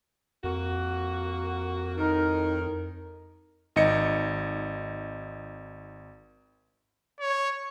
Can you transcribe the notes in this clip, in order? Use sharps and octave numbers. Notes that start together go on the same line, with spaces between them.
F2 A#3 F#4
A2 D#3 D#4 A#4
G#1 D#4 D#5 C#7
C#5